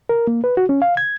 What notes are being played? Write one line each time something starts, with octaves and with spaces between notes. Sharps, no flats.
A#4
A#3
B4
F#4
C#4
F5
G#6